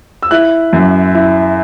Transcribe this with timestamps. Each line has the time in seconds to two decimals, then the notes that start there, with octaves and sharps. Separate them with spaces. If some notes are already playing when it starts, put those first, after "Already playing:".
0.23 E6
0.31 E4 F#6
0.73 F#2
1.14 E4